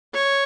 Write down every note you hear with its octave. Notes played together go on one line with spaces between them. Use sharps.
C#5